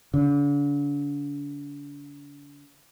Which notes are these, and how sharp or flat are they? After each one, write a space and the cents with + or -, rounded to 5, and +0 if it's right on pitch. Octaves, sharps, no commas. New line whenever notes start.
D3 -40